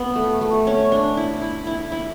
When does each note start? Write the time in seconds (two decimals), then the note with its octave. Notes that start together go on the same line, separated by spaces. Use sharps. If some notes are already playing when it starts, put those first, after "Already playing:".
Already playing: B3
0.16 A3
0.41 A3
0.67 C#4
0.92 D4
1.17 E4
1.41 E4
1.67 E4
1.92 E4